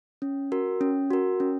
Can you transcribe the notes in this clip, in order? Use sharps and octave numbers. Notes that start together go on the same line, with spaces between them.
C#4
F#4 A#4
C#4
F#4 A#4
C#4